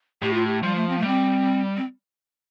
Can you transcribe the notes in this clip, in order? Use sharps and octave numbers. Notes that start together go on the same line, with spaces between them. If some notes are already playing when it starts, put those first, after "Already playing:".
A2 G4
F4
G4
F3 G3
A3
C4
A3
G3 C4
C4